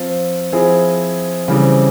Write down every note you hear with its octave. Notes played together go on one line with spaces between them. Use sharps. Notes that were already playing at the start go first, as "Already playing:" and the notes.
Already playing: F3 C4 F4
F3 C4 E4 G#4
C#3 E3 G3 C4